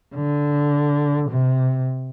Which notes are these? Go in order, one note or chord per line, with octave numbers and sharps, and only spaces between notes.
D3
C3